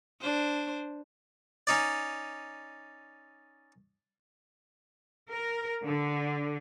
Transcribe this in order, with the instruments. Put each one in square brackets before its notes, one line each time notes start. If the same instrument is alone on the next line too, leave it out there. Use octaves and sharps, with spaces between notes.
[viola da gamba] D4 C5
[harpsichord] C#4 D#4 D5
[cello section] A#4
D3